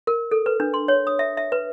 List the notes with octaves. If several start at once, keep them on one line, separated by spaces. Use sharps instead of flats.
A#4
A4
B4
D4
C6
C#5
D#6
E5
E5
B4